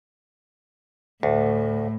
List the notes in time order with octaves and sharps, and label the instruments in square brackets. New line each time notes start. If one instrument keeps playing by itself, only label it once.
[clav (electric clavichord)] D2 [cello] A2